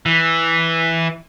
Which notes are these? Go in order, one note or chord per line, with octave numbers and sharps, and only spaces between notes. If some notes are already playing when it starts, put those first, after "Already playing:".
E3